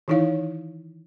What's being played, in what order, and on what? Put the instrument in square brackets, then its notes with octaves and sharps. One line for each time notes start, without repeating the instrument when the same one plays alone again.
[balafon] D#3 E3 D#4 E4 C#5 F5